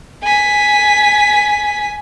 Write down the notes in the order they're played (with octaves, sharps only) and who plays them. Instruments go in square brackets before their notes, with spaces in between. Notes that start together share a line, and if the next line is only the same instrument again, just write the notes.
[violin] G#5 B6